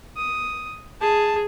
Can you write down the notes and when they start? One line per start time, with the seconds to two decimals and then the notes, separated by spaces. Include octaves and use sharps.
0.17 D#6
1.01 G#4 A5